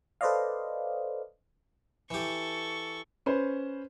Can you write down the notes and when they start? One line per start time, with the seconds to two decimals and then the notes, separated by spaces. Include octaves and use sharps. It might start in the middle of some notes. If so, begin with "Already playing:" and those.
0.21 A4 B4 C5 D5 D#5 F5
2.11 E3 G4 A4 C#6
3.26 C#4 B4 C5